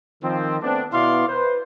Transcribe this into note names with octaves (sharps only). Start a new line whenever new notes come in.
D#3 F3 C4
A3 B3 C4 D4
B2 B3 E4 D5 F5 C6
B4 C5